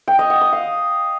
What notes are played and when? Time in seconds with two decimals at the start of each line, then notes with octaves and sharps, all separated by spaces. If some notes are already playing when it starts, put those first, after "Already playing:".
0.08 G5
0.19 D#5
0.30 F#5
0.41 D#6
0.52 F5